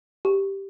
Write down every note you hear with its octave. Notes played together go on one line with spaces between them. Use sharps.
G4